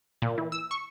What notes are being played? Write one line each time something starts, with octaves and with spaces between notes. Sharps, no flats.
A#2
E3
E6
C#6